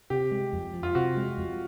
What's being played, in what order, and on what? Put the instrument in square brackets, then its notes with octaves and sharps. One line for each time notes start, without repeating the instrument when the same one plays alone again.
[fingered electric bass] C3 [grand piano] G4
[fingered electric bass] G#3
F2
F3
[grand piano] F4
[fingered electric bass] C3 [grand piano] F#4
[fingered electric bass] G#3
F2